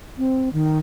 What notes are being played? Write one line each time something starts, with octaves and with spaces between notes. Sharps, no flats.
C4
D#3